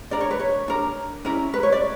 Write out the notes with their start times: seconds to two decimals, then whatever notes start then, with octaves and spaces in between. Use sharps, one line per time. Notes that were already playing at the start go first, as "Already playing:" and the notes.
0.11 D4 A#4 D5
0.21 C#5
0.31 B4
0.39 C#5
0.68 D4 A#4
1.25 C#4 E4 A#4 D5
1.54 B4
1.63 C#5
1.72 D5